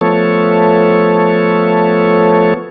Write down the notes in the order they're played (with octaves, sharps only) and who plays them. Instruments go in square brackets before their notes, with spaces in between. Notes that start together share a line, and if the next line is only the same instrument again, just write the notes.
[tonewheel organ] F3 A3 B3 A4 C#5